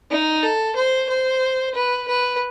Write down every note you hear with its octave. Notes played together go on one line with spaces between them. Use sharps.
D#4
A4
C5
C5
B4
B4